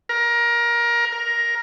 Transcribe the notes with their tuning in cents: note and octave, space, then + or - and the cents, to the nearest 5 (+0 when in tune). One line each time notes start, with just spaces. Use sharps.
A#4 +20
A#4 +10